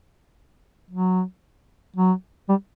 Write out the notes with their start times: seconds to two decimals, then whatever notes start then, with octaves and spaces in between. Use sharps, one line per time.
0.91 F#3
1.96 F#3
2.49 G3